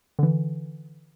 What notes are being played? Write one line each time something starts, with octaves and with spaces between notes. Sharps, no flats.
D3 E3